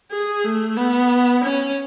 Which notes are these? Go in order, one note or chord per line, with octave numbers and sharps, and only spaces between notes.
G#4
A3
B3
C#4